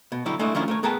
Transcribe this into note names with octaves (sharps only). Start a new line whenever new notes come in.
B2
D3 F#3 G3 E4 G4
G#3 A3 D4 E4 D#5
D#3 F3 A3 C#4 D4 E4
A3 A#4 C#5
B3 G#4 A#4 B4 G5 A5